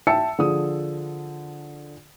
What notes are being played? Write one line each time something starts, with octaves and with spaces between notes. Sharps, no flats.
E5 G5 A5 E6 C#7
D3 F3 G#4 D#6